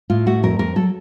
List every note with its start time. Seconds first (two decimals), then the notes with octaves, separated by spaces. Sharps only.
0.10 A2 F4
0.26 A3 F#4
0.43 F2 A#4
0.59 F2 A#4
0.76 F#3 A4